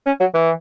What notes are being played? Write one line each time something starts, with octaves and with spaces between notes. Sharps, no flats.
C#4
F#3
E3